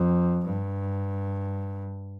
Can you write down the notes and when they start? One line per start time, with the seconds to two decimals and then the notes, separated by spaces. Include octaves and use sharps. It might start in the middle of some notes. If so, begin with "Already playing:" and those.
Already playing: F2
0.45 G2